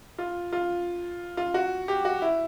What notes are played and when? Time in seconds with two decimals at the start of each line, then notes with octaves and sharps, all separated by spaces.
0.19 F4
0.53 F4
1.37 F4
1.54 F#4
1.88 G4
2.05 F#4
2.22 E4